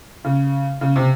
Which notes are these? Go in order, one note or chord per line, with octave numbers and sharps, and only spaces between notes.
C#3
C#3
C3